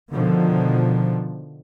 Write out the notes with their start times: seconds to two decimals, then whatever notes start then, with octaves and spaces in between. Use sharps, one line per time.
0.12 B2 D3 D#3 F3